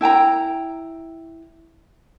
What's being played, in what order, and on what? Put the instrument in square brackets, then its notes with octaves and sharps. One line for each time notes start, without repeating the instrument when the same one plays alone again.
[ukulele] E4 G5 A5 A#5